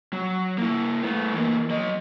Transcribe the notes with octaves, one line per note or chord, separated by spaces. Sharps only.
F#3
A#3 E4
A3 B3
E3 A#3
F#3 D#5